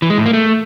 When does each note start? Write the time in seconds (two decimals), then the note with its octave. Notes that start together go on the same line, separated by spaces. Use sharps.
0.02 E3
0.10 G#3
0.18 A2
0.26 A#3
0.34 A3